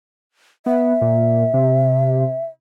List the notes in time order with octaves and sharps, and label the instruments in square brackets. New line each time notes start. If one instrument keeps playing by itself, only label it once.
[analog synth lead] B3 [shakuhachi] E5
[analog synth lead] A#2
C3